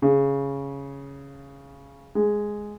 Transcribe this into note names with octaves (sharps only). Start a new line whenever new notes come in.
C#3
G#3